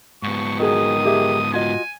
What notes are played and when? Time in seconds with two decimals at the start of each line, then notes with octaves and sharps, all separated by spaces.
0.23 G#2 B3 C#6
0.60 D#3 F#4 G#4 D#6
1.05 G4 G#4 E5
1.53 F4 F#4 D#5 G#5